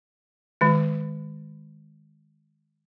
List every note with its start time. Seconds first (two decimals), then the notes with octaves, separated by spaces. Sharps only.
0.61 D#3 G#3